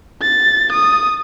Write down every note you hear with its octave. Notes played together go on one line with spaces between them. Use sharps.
A6
D#6